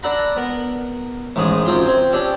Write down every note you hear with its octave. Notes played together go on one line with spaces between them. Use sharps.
D4 A4 F#5 A#5 B5
B3 A#4
A1 G#2 D#3 D#6
F#2 C4 F4 C6
C4 G#5
C#4 D4 G4 A4